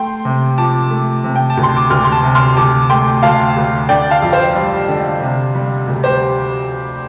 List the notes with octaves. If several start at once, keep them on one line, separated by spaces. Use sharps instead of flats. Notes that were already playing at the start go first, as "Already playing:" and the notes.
Already playing: A3 G5 C6
C3
F3 A5 D6
A3
C3
G5
A5
D2
C6
D6
D2 C6 F6
C6
A5 D6
C3
C6 F6
D2 A5 D6
A3 G5 C6
D2 F5 A5
D2
D3 D5 G5
F5 A5
F2
C5 F5
G3
D3
C3
G3
D2
G4 C5